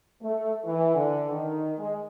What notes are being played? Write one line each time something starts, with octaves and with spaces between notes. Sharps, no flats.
A3
E3
D3
D#3
G#3